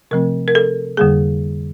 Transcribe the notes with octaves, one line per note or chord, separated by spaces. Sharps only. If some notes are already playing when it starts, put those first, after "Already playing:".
C3 F3 A3 C4 A#4
A#4
A4
F2 D3 G3 A#3 G#4